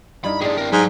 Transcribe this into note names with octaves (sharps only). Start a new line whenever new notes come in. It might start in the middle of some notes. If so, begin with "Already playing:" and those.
G2 D#4 E4 B5
G3 D4 E4 G4 G#4
C4 A#4
G#2 F#3